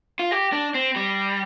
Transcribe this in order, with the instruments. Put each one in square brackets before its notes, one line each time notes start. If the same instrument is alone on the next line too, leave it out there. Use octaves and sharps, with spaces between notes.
[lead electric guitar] F4
[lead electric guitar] G4 [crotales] A#6
[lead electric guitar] D4
[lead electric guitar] C4 [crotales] C7
[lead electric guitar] G3